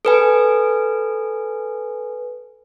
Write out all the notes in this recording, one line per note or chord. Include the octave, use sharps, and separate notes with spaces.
A4 B4 G#5